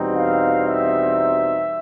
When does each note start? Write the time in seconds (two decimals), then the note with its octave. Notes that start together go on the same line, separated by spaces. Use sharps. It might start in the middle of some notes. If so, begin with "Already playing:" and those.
Already playing: E2 B2 G3 C4 D#4
0.17 F5
0.66 E5